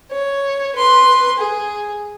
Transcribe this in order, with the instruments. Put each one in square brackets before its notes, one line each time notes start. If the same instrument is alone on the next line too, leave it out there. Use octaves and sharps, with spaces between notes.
[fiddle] C#5
B4 C6
G#4